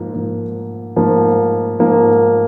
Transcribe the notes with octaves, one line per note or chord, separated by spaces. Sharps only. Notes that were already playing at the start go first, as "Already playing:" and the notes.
Already playing: G#2 F3 A#3
G#2 F3 A#3
G#2 F3 A#3
G#2 F3 A#3